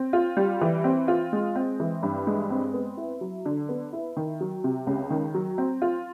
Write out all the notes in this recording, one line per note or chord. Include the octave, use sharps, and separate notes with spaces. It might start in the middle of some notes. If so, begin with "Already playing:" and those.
Already playing: C4
F4
G3
E3
C4
F4
G#3
C4
E3
G2
G#3
C4
B3
E4
F#3
D3
B3
E4
D#3
F#3
C3
C#2
D#3
F#3
C4
F4